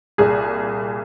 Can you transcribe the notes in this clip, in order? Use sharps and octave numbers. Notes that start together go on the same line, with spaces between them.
C2 A#2 G#4